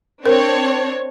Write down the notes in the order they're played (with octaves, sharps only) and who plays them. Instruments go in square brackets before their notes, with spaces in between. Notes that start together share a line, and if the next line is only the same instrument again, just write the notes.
[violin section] C4 D4 C#5 [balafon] A#4